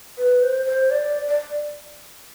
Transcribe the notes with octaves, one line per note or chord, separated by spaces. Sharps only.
B4
C5
C5
D5
D5